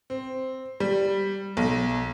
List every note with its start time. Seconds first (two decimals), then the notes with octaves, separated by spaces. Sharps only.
0.10 C4
0.80 G3
1.57 B1